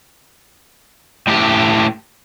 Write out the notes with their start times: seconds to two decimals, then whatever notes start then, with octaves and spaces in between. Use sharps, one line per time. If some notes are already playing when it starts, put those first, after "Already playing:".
1.27 A2 G4